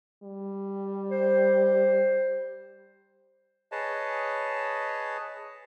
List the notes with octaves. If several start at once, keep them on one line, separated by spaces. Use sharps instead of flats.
G3
C5
G#4 B4 C#5 D#5 A5